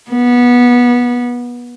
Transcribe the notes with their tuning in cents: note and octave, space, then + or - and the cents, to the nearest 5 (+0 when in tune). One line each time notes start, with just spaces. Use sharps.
B3 -20